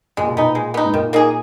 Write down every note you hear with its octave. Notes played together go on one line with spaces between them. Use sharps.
A#2 G#3
B2
A#2 B3 D#4
G#3
B3 D#4
G#2
A#2 D#3
A#3 D#4 G#4